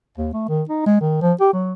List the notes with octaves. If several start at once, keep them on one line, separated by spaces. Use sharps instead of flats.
D#2
A3
D#3
D#4
G#3
D#3
F3
G4
F#3